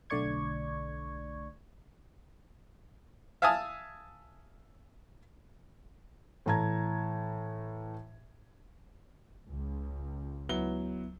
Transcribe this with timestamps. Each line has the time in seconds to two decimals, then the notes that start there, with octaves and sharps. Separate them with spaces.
0.10 B1 D3 A3 D5 C#6 G#6
3.42 E5 F5 G#5 A5 D#6
6.46 A2 E3 A5 A#5 G#6
9.46 C#2
10.49 F#3 B3 E4 G7